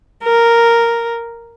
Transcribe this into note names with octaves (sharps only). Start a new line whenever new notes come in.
A#4